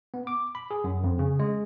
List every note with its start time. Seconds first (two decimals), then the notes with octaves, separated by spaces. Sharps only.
0.14 B3
0.27 D6
0.55 B5
0.71 G#4
0.84 F#2
1.04 F2
1.19 C#3
1.39 G#3